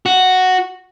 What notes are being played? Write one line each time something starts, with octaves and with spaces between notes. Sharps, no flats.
F#4